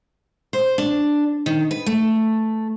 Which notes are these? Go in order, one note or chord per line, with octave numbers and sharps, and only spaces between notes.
C5
D4
D#3
B4
A3